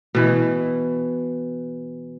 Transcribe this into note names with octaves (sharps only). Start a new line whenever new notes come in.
B2 E3